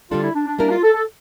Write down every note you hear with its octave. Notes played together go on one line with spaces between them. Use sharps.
D3 G3 D4 F4 A4
E4
D4
D4
G3 A#3 D4 E4 A#4
F4
A4
A4